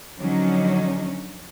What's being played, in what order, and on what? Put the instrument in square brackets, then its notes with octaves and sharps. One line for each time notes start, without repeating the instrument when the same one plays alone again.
[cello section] D3 F3 F#3 C#4 D#4